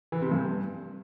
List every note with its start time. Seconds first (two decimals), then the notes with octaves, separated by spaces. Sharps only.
0.12 E3
0.22 C3
0.31 G2